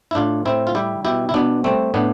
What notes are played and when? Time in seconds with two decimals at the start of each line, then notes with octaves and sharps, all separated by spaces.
0.11 E4
0.15 A2 D4 F4
0.45 A2 C4 E4
0.67 F4
0.75 G3 E4 G4
1.05 B2 E4 G4
1.29 E4
1.34 B2 B3 D4
1.64 G3 A3 C4
1.94 A2 B3 D4